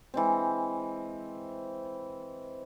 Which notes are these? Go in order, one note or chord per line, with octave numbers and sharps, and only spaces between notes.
E3 G#3 C4